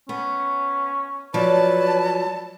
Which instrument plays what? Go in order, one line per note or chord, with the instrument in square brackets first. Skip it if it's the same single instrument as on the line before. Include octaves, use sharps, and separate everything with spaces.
[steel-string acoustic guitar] B3 [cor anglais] C#4
[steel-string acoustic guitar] F3 F#3 D5 [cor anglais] B4 [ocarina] C#5 [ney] A5